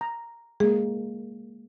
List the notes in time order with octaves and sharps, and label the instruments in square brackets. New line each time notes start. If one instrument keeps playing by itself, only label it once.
[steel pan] A#5
[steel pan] G#3 A#3 [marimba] G#4